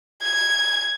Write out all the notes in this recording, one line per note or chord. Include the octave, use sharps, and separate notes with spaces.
G#6